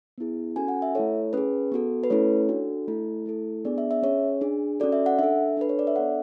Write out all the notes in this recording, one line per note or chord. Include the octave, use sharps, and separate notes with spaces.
B3 E4 G#4
C#4 F#4 A4 G#5
F#5
E5
A3 E4 A4 C#5
C#4 G#4 B4
B3 F#4 A4
B4
A3 C#4 E4 A4 C#5
D4 F#4 A4
A3 E4 A4
A3 E4 A4
B3 D4 G#4 D5
E5
E5
C#4 G#4 C#5
D4 G#4
C#4 F#4 A4 D5
E5
F#5
D4 A4 E5
D4 A4 B4
C#5
D5
E5
B3 D4 A4 F#5